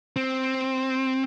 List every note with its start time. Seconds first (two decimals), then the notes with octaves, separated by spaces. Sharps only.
0.16 C4